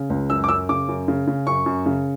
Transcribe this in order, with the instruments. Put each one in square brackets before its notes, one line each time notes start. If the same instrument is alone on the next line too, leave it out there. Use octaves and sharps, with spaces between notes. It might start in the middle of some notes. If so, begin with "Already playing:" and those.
Already playing: [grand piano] C#3
C#2
F#2 E6
D6
F#2 E6
C#3 D6
F#2
C#3
C#3
F#2 C#6
F#2
C#3